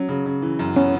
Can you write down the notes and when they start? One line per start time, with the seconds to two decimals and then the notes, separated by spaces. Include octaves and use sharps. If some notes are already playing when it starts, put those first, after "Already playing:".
Already playing: F#3 C#4
0.09 C#3
0.26 C#3
0.42 E3
0.59 F#2
0.76 B3 C#4